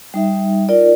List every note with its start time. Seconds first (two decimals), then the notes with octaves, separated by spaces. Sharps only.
0.14 G3 D#4 E5
0.69 D#4 F4 A#4 D5